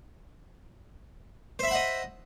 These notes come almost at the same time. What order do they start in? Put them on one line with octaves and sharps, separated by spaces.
C5 E5 B5 F#5 D#5